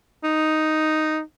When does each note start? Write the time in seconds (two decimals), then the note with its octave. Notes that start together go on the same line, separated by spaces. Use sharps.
0.24 D#4